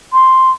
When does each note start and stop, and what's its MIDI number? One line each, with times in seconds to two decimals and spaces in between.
0.13 0.51 84